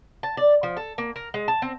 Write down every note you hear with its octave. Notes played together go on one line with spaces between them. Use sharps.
A5
D5
F3
A4
A#3
A#4
G#3
A5
C4